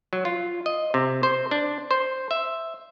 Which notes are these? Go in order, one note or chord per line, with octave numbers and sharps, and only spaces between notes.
F#3
F4
D#5
C3
C5
D4
C5
E5